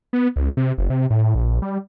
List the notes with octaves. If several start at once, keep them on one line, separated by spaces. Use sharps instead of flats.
B3
C#2
C3
F#1
C3
A2
A#1
G3